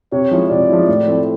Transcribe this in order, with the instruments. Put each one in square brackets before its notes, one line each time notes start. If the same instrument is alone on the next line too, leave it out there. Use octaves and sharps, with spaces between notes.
[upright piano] C3 [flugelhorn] C#5
[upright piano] F3 G#3 C#4 E4
[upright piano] C3 [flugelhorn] D5
[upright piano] F3 G#3 C#4 E4
A2
F3 A3 C4 E4